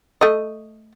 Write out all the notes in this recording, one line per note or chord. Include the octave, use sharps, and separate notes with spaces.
A3 D#5